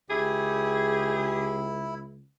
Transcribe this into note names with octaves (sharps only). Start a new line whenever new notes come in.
C#2 E4 G4 G#4